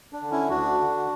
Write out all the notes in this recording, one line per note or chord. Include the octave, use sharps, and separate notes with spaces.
D4
D3
C#4 E4
D2 D4 F#4
D3